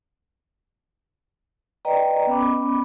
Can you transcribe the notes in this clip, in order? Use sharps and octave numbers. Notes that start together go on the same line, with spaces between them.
B4 D5 D#5 G5 A#5
B3 C#4 B5 D6